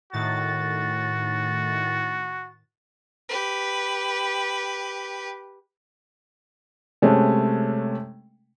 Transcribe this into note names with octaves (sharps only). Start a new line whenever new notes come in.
A2 D#3 F#4 A6
G4 B4
C3 G#3 A3 C#4